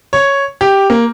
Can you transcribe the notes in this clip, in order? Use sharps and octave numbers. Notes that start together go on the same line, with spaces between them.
C#5
G4
A#3